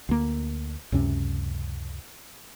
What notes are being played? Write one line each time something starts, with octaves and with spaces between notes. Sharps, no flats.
D2 A#3
C#2 F#2 C3 C#4